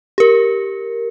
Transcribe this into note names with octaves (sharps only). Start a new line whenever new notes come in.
G4 A#4